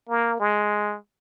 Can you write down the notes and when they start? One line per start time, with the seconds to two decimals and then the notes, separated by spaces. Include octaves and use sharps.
0.09 A#3
0.40 G#3